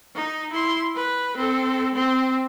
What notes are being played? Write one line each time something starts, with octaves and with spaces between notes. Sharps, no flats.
D#4
E4 C6
B4
C4 A4
C4